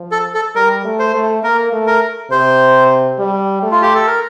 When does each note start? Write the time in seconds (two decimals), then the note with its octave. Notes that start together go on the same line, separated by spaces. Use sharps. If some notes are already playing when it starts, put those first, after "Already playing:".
Already playing: F3
0.12 A4
0.34 A4
0.55 G3 A#4
0.85 A3
0.99 C5
1.14 A3
1.43 A#3 A#4
1.73 A3
1.87 A#4
2.31 C3 C5
3.19 G3
3.62 A3
3.71 F4
3.82 G4
3.95 A4
4.07 A#4